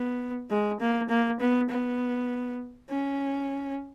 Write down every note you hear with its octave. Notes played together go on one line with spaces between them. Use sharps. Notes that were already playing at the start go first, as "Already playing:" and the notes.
Already playing: B3
G#3
A#3
A#3
B3
B3
C#4